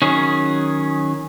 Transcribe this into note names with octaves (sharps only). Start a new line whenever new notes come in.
D#3 F#3 C#4 G#4